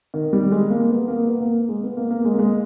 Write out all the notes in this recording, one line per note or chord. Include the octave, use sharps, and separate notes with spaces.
D#3
G3
G#3
A#3
B3
A#3
B3
A#3
G#3
B3
A#3
A#3
G#3
A#3
G#3